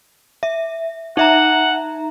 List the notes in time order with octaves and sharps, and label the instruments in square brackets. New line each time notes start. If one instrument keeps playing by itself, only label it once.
[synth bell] E5
[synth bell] D#4 E5 A#5 [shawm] F#5